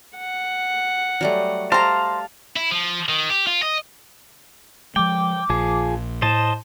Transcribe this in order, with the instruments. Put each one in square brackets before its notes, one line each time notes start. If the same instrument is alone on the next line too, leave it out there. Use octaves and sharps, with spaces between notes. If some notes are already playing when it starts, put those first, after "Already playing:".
[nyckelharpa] F#5
[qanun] F#3 G3 A3
[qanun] G4 [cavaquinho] C5 A#5 [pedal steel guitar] F5 A5
[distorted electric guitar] E4
F3
D#3
G4
F4
D#5
[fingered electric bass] F3 G#3 [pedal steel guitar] G5 [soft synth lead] D6
[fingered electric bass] A#1 [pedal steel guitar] F3 G#4
[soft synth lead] A2 [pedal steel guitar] C5 D#5 A5